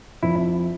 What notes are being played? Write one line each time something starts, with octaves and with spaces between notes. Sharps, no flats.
F2 E4